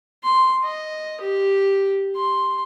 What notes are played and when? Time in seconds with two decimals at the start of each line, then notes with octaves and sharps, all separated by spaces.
0.24 C6
0.64 D#5
1.21 G4
2.16 C6